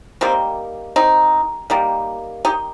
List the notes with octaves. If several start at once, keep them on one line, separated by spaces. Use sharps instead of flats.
D#3 G3 A#3 C4
C4 D#4
D#3 G3 A#3
D#4 G4